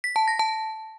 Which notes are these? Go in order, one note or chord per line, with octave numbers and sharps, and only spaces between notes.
B6
A5
A#6
A5